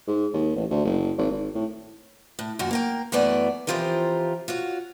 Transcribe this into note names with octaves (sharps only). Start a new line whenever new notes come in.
G#2
D#2
A1
D2
F#1
G#1
G#1
A2
A2
F#2 A#2 D#3 F#4
A#3 A#4 G5
F#2 E3 A3 B3 D5
E3 F3 C4 F4 G4 A#4
F4 F#4 C#5